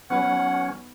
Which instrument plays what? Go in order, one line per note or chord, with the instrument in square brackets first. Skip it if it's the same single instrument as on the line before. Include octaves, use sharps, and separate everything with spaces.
[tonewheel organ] F#3 C#4 [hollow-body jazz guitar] B3 D#4 B4 [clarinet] F#5